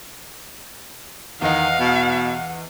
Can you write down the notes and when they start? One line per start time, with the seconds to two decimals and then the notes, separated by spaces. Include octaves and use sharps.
1.42 E2 D#3 D#5 F5 F#5
1.80 B2